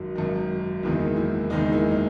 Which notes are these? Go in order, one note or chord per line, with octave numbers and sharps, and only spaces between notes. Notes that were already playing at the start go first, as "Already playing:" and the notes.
Already playing: G#1 F#2 D#3 F#4
G#1 F#2 D#3
F#1 E2 D#3 G#3 E4
E4
F#1 E2 D#3 G#3 D#4
E4
D#4